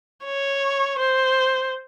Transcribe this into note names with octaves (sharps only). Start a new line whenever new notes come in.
C#5
C5